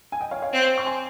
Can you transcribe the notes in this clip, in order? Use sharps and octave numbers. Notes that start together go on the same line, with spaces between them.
G#5
D#5 G5
C#5 F5
C#5 F5
C4
C#6
G#5 C6